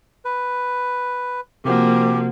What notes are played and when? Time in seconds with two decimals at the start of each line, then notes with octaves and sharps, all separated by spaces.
0.25 B4
1.65 C3 F3 A#3 F#4 G4 F#5